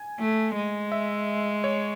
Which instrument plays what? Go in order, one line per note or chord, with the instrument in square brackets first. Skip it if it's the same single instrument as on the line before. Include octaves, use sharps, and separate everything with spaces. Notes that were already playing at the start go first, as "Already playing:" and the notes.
Already playing: [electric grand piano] G#5
[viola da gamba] A3
G#3
[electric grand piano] E5
C#5